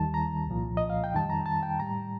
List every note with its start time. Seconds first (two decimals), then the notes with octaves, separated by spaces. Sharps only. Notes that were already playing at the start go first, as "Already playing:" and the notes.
Already playing: D#2 D#3 G3 A5
0.14 A#5
0.47 C2 A#2 F3
0.77 D#5
0.90 F5
1.04 G5
1.13 F2 D#3 G3 A5
1.30 A#5
1.46 A5
1.63 G5
1.80 A2 G3 A#5